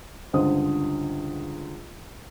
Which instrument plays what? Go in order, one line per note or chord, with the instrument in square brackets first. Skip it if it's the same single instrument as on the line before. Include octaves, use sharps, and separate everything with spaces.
[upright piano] C#2 G2 D3 C5 D#6